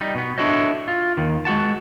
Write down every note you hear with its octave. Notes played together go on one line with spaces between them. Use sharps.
G3 D#4
B2 B3
D4 E4 F#4 A4 C#5 D#5
F4
D#2 D#3
G#3 F#4 F#5 A5